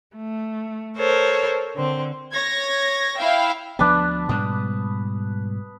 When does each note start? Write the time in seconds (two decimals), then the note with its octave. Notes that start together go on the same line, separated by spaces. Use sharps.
0.14 A3
0.97 A4 A#4 C5 C#5
1.75 D3 C4
2.32 C#5 G#6 A#6
3.17 E4 E5 F5 G5
3.79 D2 F3 B3 D4 B4 A5
4.29 G#2 B2 G3 D#6